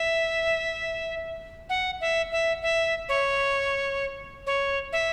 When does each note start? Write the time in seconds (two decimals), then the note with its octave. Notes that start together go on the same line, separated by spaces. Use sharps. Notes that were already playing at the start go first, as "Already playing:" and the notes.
Already playing: E5
1.69 F#5
2.01 E5
2.32 E5
2.62 E5
3.09 C#5
4.47 C#5
4.93 E5